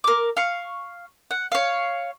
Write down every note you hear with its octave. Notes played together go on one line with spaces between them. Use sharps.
A#4 D6
F5 C#6
F#5
C#5 F5